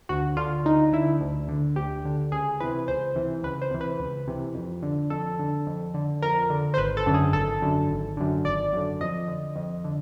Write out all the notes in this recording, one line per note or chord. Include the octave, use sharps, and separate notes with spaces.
D2 F#4
D3 F4
D2 D#4
D3 E4
D2
D3
D2 G4
D3
C#2 G#4
C3 E3 B4
C#2 C5
C3 E3
C#2 B4
C5
C3 E3
B4
C#2
C3 E3
F2
D3
F2 A4
D3
F2
D3
F2 A#4
D3
C5
G#1 B4
A4
F#2 D3
G#4
G#1 A4
F#2 D3
G#1
F#2 D3
G#1 D5
F#2 D3
F2 D#5
D3
F2
D3